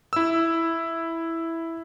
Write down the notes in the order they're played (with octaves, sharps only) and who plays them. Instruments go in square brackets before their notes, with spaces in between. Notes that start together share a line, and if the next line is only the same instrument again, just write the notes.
[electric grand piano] E4 E6